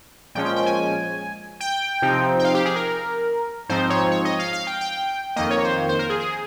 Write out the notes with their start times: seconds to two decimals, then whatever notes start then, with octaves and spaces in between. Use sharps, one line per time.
0.35 A#2 F3 G#3 C#4 G5
0.46 G5
0.56 G5
0.66 G#5
1.60 G5
2.02 C3 F3 C4 D#4
2.39 G5
2.44 F5
2.55 G4
2.65 G#4
2.76 A#4
3.69 G#2 F3 C4 D#4 C5
3.90 C#5
4.11 C#5
4.25 D#5
4.39 F5
4.53 F5
4.67 G5
4.81 G5
5.36 F2 D#3 A#3 D#5
5.50 C#5
5.64 C5
5.89 C5
5.99 A#4
6.10 G#4
6.20 G#4